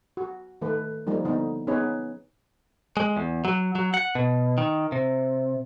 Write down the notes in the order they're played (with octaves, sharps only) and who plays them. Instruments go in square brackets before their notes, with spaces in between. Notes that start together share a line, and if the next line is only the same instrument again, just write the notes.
[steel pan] F#4
D#3 A3 B4
F3 G3 A#3 D#4
D3 B3 D#4
B3 C#4 D#4 G#4 B4 C#5
[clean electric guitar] G#3
E2
F#3
F#3
F#5
B2
D#3
C3